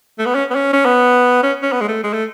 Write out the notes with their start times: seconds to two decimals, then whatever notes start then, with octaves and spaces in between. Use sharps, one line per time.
0.19 A3
0.26 B3
0.35 C#4
0.51 B3
0.55 C#4
0.73 C#4
0.85 B3
1.43 C#4
1.63 C#4
1.72 B3
1.81 G#3
1.88 A3
2.03 G#3
2.13 A3